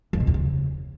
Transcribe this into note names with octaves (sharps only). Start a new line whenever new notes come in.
F2
B2
E2
C#3